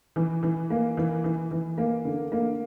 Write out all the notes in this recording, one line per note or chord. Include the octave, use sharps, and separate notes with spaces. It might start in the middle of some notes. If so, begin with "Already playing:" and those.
E3
E3
A#3
E3
E3
E3
A#3
D3
A#3